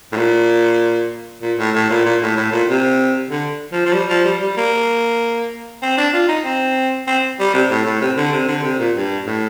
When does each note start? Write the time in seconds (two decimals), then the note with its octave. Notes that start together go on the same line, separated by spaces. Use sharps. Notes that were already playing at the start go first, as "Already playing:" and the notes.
0.12 A2
0.17 A#2
1.42 A#2
1.58 A2
1.75 A2
1.90 A#2
2.05 A#2
2.22 A2
2.37 A2
2.52 A#2
2.68 C3
3.30 D3
3.72 F3
3.85 F3
3.93 G3
4.09 F3
4.25 G3
4.41 G3
4.57 A#3
5.82 C4
5.97 D4
6.13 F4
6.28 D#4
6.44 C4
7.07 C4
7.39 G3
7.54 C3
7.70 A2
7.85 A2
8.01 C3
8.17 D3
8.32 C3
8.48 D3
8.64 C3
8.79 A#2
8.96 G2
9.26 A2